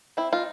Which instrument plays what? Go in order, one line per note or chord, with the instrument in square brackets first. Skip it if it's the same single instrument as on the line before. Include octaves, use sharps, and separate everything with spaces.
[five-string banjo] C4 E4
D#4 F4